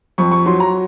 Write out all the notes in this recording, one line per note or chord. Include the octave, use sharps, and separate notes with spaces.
F2 C#6
C#6
F#3 C6
A#5